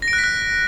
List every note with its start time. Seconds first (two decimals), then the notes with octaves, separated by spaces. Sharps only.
0.02 A#6
0.08 D7
0.13 F#6
0.18 B6
0.24 F#6